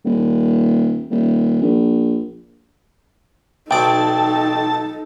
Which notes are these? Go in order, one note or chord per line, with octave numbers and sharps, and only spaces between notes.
D#1
D#1
A#1
B1 D#4 A4 D5 G5 A5